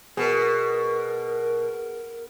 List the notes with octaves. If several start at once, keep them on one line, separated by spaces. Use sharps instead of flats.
B2 G#4 A#4